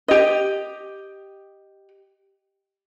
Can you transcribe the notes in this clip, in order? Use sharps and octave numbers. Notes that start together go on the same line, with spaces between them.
G4 D#5